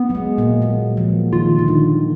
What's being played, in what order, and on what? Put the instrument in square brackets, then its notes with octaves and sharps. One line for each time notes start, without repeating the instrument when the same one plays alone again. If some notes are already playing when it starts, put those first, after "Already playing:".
Already playing: [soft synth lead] B3
[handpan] F#3
G#3
A#2 A#3
F#3
F3
[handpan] D#3 [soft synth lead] F4
[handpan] D3
D#3